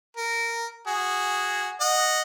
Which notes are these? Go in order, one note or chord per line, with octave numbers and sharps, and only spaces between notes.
A#4
F#4 G#4
D#5 F#5